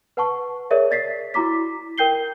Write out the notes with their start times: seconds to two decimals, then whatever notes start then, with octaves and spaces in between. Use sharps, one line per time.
0.17 B4 F#5 A5 C#6
0.71 G#4 A#4 C#5 D5 E5
0.91 D5 A6 B6 C7
1.34 E4 F#4 A#5 D6 B6
1.98 A#4 G5 G6 C7 G7